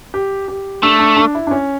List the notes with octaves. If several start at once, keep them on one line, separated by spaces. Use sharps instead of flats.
G4
G4
A3 D4
D4
D4
E4
D4
C#4